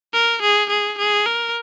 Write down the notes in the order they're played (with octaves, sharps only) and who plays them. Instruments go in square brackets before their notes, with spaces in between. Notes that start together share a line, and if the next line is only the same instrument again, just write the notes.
[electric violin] A#4
G#4
G#4
G#4
A#4